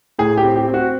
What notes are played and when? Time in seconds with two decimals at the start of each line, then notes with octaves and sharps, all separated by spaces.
0.19 A2 G#4
0.38 G4
0.43 C4
0.56 G4
0.68 C4
0.74 F#4